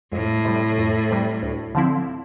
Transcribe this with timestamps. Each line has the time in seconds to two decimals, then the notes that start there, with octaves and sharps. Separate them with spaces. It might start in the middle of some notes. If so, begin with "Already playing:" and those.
0.12 F2 A2
0.45 C3 G3
0.78 F2
1.11 C3 G3
1.43 D2
1.75 D3 F3 C4 E4